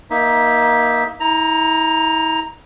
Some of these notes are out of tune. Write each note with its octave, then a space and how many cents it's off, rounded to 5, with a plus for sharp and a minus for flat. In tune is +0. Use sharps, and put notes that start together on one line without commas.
A#3 +20 D#4 +15 E5 -10
E4 -45 A#5 +5